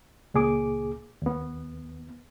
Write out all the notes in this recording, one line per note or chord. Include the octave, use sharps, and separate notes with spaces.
C#2 A#2 G#4 D6
D#2 B3